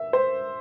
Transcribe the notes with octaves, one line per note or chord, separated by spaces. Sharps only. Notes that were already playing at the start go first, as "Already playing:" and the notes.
Already playing: E5
C5